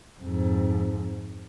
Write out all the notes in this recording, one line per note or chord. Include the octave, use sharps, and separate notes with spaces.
F2 G#2